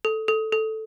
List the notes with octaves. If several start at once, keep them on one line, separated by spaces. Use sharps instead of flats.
A4
A4
A4